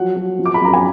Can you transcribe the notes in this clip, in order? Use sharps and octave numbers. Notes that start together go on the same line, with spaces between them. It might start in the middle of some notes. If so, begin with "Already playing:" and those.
Already playing: F3 F#3 F#5
F#3
F3
D6
B5
F#2 A#5
G#5